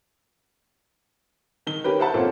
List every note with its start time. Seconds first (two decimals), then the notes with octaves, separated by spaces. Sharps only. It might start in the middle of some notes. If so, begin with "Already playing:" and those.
1.67 D#3 G7
1.84 C#4 G4 A#4 B4
1.99 C5 E5 F#5 A5
2.14 A#2 C4 C#4 A4 A#4